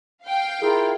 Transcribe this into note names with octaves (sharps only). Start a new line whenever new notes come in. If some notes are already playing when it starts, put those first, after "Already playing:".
F5 G5
E4 F4 G#4 A#4 D#6 E6